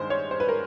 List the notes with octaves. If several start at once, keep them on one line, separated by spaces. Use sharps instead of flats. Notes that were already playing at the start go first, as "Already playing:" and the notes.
Already playing: G2 D#3 G#3 C5
C#5
C5
B4
A#4